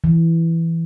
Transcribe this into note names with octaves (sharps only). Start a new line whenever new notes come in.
E3